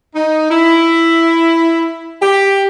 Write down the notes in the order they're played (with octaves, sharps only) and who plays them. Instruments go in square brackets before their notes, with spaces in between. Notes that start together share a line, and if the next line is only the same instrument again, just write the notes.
[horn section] D#4
E4
G4